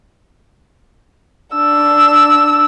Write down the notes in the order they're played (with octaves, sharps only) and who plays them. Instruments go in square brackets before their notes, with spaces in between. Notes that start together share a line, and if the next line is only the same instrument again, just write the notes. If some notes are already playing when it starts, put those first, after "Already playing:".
[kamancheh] D4 E6